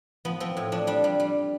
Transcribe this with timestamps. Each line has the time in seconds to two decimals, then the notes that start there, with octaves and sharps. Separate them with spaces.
0.25 F3 B3
0.40 F3 C4
0.57 A2
0.72 F3 D4
0.87 G3 D4
1.04 G3
1.20 G3